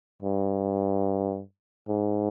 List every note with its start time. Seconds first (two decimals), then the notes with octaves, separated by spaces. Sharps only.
0.22 G2
1.89 G#2